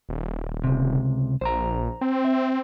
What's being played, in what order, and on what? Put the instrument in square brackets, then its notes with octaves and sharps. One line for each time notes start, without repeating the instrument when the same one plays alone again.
[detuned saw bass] D#1
[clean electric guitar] C#2 C3
[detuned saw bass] A#1 [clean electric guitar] C5 A#5
[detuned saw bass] C4
[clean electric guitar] E5